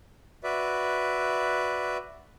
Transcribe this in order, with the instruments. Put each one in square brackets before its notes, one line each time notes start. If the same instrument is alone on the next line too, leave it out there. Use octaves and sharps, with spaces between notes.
[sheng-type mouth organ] F#4 B4 D5 E5